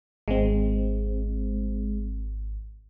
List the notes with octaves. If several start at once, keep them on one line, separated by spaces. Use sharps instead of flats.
G#1 G#3 C4